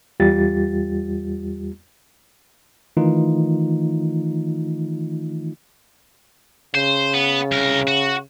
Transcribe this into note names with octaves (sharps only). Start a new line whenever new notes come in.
E2 G3 F4 G4 A6
D#3 E3 A3 D#4 F4
C#3 C5
B3
C2 A#4
F#4